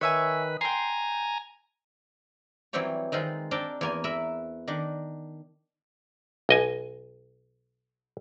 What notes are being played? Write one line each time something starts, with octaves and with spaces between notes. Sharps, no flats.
D#3 B4 C#5 E5 G#5
G5 G#5 A#5 C6
E3 F#3 G3 C4 G4 C#5
D#3 G#3 C4 F4
C4 D4 A#4 G5 A5
E2 A#3 G#5
A#4 B4 E5 B5
D#3 D4
B1 D#5 G#5